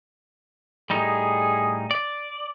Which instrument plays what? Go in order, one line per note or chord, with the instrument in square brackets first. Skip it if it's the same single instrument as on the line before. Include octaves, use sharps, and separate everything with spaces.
[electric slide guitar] A2 G3 D#4 [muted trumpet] G#4
[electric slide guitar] D5